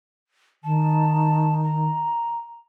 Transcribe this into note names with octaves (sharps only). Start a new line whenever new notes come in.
D#3 A5
A#5